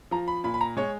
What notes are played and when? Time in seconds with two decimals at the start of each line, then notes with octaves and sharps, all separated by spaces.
0.11 F3 A#5
0.28 B5
0.44 A#2 B5
0.54 B5
0.61 A#5
0.77 G#3 C#5